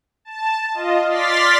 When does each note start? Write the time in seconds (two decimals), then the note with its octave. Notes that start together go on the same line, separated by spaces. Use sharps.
0.25 A5
0.74 F4 D#5
1.07 D5 C6 F6 A6 B6